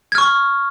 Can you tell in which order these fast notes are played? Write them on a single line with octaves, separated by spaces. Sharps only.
G#6 F6 C#6